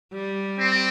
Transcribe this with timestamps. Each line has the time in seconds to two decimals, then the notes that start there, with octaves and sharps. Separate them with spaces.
0.13 G3
0.59 C4